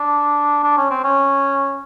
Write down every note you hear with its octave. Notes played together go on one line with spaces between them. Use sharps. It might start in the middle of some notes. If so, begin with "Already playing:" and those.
Already playing: D4
D4
C#4
C4
C#4